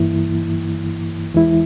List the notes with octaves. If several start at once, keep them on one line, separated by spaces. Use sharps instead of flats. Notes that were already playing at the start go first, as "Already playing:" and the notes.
Already playing: G2 E3 A#3 E4
E2 E3 G#3 E4